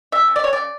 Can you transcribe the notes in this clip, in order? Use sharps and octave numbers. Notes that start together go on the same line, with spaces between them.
C#3 E5
C#3
D5
G#3 C#5
D5
C#3